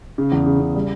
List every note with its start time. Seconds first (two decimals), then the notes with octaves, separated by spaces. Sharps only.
0.18 C#3
0.32 E2
0.46 C#3
0.60 C#3
0.75 G3